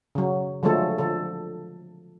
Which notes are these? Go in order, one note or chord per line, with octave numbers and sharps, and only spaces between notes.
C#3 F#3
D3 F3 F#3 G#3 A3 A4
D3 F3 A4